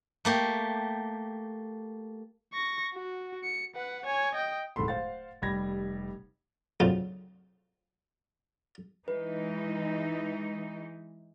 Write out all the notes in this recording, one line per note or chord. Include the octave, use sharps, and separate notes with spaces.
A3 A#3 G4
C#6 A#6
F#4
C#7
B4 F#5
C#5 G#5
D#5 G5
D1 G#2 A4 B5 C6
C5 F5 F#5 A6
F1 G3 B5 G#6 A#6
D2 C#3 F#3 C4 D#4 F4
E3 G#3 D#4 B4